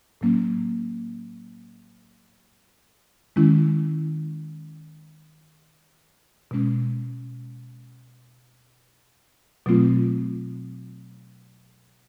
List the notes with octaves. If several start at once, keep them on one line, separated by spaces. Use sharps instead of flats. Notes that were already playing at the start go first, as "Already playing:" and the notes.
A2 F#3 A#3 C#4
D#3 G#3 C#4 E4
B2 G#3 C#4
B2 F#3 A3 C4 F4